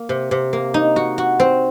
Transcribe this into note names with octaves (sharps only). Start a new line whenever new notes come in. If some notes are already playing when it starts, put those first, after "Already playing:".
Already playing: A#3
C3
C3
A#3
D#4
F#4
F#4
C4